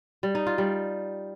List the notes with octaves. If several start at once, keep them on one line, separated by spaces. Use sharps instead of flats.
G3
D#4
F4
G3